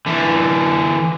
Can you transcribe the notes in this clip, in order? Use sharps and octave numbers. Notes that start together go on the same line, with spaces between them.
D3 E3